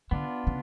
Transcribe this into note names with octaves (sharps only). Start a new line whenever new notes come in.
D3 B3 D4 F4
C#3